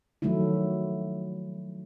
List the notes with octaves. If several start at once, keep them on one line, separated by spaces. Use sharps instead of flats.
D#3 F3 F#3 A3 D#4 E4